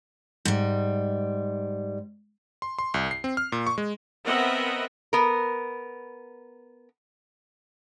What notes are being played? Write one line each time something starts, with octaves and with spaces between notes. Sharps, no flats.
G#2 G3
C6
C6
C2
C7
C4
F6
A#2
C#6
G#3
B3 C4 A#4 D#5 E5 F#5
B3 A#4